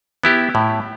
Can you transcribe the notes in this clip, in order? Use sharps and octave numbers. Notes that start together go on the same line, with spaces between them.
B3 E4 G4
A2